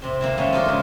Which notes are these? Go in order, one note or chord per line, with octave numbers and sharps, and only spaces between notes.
C3 C4
A#3 C4 E4
G#3 A3 C#4 D#4 E4
F3 D4 D#4 G4 A#4 C5
C#3 G#3